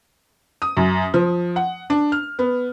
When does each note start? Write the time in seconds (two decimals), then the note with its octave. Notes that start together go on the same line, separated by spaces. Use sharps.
0.62 D#6
0.77 F#2
1.14 F3
1.56 F#5
1.90 D4
2.12 F6
2.39 B3